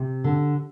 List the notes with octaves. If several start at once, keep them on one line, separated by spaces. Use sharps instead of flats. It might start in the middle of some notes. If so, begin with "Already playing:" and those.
Already playing: C3
D3